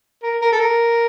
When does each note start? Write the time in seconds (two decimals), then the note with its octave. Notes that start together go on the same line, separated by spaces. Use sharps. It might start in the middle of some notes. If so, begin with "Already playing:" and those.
0.23 A#4
0.42 A#4
0.52 A4
0.60 A#4